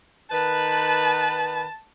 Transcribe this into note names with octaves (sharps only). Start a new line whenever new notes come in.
D#3 B4 A5